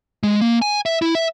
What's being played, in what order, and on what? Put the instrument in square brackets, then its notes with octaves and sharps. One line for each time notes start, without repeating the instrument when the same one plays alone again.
[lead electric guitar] G#3
A#3
G#5
E5
E4
E5